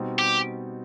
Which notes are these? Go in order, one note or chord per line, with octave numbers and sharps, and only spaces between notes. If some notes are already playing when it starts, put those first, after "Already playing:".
Already playing: B2 G3 C4 D#4
G4